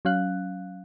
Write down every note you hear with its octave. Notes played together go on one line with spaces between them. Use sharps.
F#3 C#4 F5 F#6